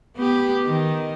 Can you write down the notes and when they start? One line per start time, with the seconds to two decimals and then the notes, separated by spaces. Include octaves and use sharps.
0.17 B3 G4
0.65 D#3